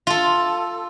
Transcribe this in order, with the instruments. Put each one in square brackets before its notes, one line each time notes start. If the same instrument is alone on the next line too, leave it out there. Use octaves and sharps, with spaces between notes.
[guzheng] F4 A4